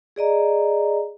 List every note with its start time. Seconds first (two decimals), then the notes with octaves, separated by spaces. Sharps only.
0.16 G#4 D5 D#5 A#5